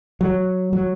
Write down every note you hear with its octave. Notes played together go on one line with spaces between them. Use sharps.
F#3
F#3